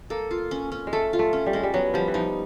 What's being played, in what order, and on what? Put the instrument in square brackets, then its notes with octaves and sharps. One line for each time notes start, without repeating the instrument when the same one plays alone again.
[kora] A#3 [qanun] A4
[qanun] F4
C#4
C#4
[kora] G#3
[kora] A3 [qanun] A4
[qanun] F4
[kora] A3
[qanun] C#4
[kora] G3
[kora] G#3 [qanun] C#4
[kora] G3
[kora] F#3 [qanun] B3
[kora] F3 [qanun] G3
[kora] E3
[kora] F3 [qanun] D#4